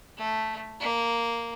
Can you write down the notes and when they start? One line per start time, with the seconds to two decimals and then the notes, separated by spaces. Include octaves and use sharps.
0.18 A3
0.81 A#3